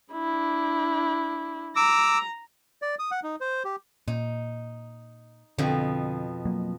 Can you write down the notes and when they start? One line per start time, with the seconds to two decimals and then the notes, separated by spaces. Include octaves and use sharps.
0.13 D4 E4
1.76 A#5 D6 E6
2.82 D5
2.99 D#6
3.11 F#5
3.23 D#4
3.41 C5
3.65 G4
4.08 A#2 D#4
5.58 F2 B2 D3
6.45 F#3 A#3